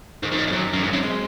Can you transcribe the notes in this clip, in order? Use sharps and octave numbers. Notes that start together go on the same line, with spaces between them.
G#2 D#3
F2
F#2
F2
F#2 F#3
F#3
F#2 C#4
G#2 C#4
F#2 C4
G#3